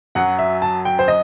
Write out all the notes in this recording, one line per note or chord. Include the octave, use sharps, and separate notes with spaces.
F#2 F#3 F#5
E5
A5
G5
C5
D#5